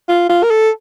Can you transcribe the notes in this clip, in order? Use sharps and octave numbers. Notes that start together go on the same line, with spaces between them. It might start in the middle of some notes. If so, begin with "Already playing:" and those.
F4
F4
A#4
A4